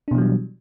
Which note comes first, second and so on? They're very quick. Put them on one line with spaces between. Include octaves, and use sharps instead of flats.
D4 B2 E3 F#3 G3